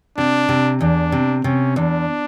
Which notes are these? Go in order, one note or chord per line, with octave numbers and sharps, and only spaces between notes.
C3 D4
C3
E2 D4
C3
C3 C#4
E2 D4